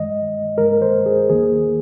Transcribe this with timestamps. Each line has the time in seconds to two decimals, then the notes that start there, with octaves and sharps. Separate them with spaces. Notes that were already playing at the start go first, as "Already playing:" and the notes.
Already playing: G2 D#3 G#3 D#5
0.57 G2 D#3 G#3 A#4
0.82 C5
1.06 G#4
1.30 D#2 D#3 A#3 G#4